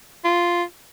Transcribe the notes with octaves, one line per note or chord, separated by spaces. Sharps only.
F4